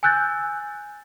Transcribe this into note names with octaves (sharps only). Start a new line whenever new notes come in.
G#5 E6 F#6 G6 A6